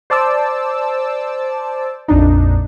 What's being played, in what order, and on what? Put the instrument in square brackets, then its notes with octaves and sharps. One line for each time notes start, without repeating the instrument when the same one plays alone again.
[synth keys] C5 D5 A5 D6 E6
A#1 F2 D4 D#4